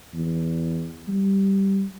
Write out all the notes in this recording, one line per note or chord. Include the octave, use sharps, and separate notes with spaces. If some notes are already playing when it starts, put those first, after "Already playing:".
E2
G3